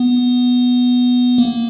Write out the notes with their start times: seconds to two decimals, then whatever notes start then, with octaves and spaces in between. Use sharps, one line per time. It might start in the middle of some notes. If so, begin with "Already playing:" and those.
Already playing: B3
1.38 A#3